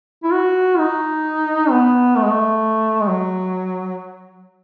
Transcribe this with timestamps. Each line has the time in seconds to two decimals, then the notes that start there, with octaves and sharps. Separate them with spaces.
0.24 E4
0.32 F#4
0.79 D#4
1.71 B3
2.16 A3
2.23 G#3
2.31 A3
3.02 G#3
3.08 F#3